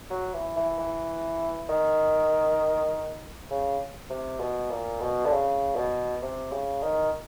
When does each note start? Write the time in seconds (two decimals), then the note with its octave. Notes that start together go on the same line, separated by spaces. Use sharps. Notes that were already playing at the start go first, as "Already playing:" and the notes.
0.11 F#3
0.34 E3
0.56 E3
0.79 E3
1.69 D#3
3.51 C#3
4.10 C3
4.40 B2
4.70 A#2
5.01 B2
5.26 D3
5.32 C#3
5.76 B2
6.22 C3
6.52 C#3
6.82 D#3